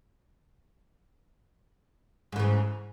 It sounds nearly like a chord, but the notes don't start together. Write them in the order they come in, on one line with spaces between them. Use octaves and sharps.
G#2 E3 C#3